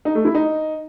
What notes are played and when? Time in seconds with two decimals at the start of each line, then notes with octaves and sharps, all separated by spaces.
0.05 D#4
0.15 A3
0.25 E4
0.35 D#4